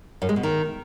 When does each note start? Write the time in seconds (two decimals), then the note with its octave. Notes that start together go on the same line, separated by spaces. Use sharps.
0.22 F#2
0.29 G#3
0.36 B2
0.43 D#3